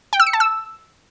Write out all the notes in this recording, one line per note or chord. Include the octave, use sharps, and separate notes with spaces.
G5
E6
C#7
A5
E6